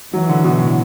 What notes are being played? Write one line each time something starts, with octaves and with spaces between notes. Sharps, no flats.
E3 F#3
D3
B2
A2